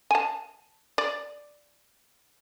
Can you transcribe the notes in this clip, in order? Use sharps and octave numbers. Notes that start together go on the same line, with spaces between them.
G#5 A5
D5